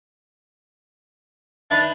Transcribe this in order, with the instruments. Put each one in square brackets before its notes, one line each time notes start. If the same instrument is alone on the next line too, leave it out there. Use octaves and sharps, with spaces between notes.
[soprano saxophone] D4 [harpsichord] D#4 B4 E5